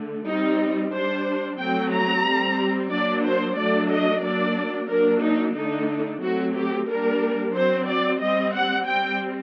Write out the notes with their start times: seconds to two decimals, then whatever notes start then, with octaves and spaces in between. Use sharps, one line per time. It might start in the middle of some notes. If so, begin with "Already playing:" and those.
Already playing: D3 A3
0.27 G3 C4 D#4
0.93 G3 D4 C5
1.59 F#3 A3 C4 G5
1.92 A#5
2.25 G3 C4
2.91 F#3 A#3 D4 D5
3.25 C5
3.58 F#3 A3 D4 D5
3.91 D#5
4.24 F#3 A#3 D4 D5
4.90 F#3 A#3 D4 A#4
5.23 D#4
5.56 D3 A3 D4 D#4
6.22 F#3 A3 C4 F#4
6.56 G4
6.88 G3 A#3 D4 A#4
7.55 F#3 C4 C5
7.88 D5
8.21 G3 C4 D#5
8.54 F#5
8.87 G3 C4 G5